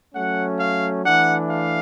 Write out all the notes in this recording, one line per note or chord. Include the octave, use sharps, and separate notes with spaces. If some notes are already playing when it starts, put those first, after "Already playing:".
F#3 A3 C#4 F#5
F5
E3 A3 D4 F#5
F5